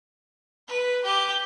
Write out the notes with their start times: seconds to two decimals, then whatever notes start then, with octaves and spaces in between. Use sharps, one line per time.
0.68 B4
1.04 G4